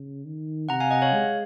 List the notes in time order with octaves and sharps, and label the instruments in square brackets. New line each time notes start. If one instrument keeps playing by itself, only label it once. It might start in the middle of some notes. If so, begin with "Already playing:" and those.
Already playing: [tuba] C#3
D#3
[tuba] C3 [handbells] F#5 A#5
[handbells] F5 G#5
D#5 F#5
C#5 F5
[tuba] G#3